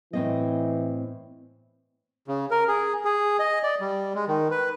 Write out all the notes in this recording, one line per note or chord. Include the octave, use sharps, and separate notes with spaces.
A2 E3 C4 D#5
C#3
A#4
G#4
G#4
D#5
D5
G3
G#3
D#3
B4